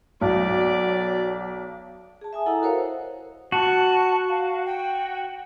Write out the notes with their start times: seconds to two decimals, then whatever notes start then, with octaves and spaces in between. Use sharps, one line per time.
0.21 B1 F#3 D5
2.21 G#4 A5
2.33 E5 G#5 D#6
2.46 E4 A4 D#5 F#5 A#5 E6
2.62 F#4 A#4 C5 C#5 F5
3.52 F#4 A5
4.29 F5
4.66 G5